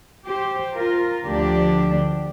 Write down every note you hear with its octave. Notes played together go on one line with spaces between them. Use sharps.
G4 C5
F4 A#4
D2 D3 F3 D4 G4